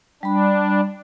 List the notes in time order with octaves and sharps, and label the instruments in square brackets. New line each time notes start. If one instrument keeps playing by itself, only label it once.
[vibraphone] G3 B5 [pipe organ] D4